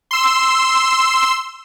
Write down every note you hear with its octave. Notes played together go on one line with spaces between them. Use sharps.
C6 E6